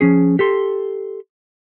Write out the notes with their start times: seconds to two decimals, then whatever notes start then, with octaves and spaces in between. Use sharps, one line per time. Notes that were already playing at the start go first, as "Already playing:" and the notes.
0.01 F3 C#4 G#4
0.39 G4 A4 C6